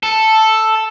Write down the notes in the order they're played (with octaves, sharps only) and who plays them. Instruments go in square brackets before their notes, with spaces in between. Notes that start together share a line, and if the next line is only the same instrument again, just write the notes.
[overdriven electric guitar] A4